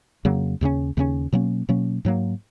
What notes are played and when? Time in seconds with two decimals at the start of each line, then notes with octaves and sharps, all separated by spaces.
0.25 F2 C#3 F#3 A#3
0.61 D#2 C#3 G#3 C#4
0.97 D#2 C#3 G#3 C#4
1.33 B2 F#3 A#3 C#4
1.69 B2 F#3 A#3 C#4
2.05 G#2 F#3 A#3